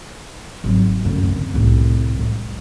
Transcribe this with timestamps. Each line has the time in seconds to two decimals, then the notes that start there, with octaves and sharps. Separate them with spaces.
0.64 G#1 F#3
1.05 F#2 D3
1.24 C4
1.54 C2 A2
2.18 F3 G#3